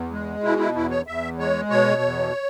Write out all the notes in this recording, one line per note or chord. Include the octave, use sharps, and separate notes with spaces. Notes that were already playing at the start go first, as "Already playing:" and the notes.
Already playing: E2
G#3
B2 E4
E4
E2 E4
C#5
E2 E5
G#3 C#5
B2 C#5
E2